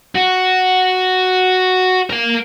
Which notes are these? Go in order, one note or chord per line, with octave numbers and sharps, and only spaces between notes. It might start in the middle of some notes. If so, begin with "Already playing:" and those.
F#4
A#4 F5